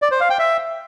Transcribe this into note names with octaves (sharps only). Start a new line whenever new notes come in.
D5
C5
F5
G5
E5